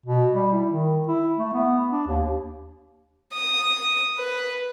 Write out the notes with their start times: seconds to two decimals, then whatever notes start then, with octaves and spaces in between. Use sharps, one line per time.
0.06 B2
0.34 G3
0.53 E4
0.72 D#3
1.08 E4
1.38 A3
1.53 B3
1.92 D4
2.07 D#2
3.33 D#6
4.18 B4